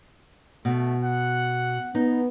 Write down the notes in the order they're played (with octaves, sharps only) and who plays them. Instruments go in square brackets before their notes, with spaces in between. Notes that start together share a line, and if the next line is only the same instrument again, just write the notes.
[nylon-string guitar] B2 [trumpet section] A3
[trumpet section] F#5
[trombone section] B3 [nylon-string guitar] D#4